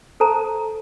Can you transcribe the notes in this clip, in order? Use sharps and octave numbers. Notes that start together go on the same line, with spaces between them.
A4 C5 A5 A#5